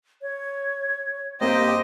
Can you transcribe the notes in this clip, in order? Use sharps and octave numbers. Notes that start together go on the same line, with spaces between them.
C#5
G2 A#3 C4 G4 C5 D#5